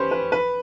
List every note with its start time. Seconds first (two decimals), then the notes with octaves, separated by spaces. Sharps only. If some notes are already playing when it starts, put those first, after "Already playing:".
Already playing: C#4 G4 B4 C5
0.11 B4
0.32 B4